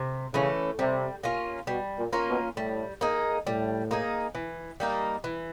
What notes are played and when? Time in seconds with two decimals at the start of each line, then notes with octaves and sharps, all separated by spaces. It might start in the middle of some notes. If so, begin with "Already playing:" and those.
Already playing: C3
0.34 C#3 E3 A3 C#4
0.79 C3 G3
1.23 A#3 C#4 F4
1.67 B2 G3
1.97 A#2
2.13 A#3 C#4 F4
2.28 B2
2.57 A2 G3
3.01 A#3 D#4 G#4
3.46 A2 G3
3.91 A#3 D#4 G#4
4.35 E3
4.80 G3 A#3 D#4
5.24 E3